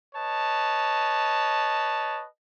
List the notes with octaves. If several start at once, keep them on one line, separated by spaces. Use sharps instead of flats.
B4 C#5 D#5 A5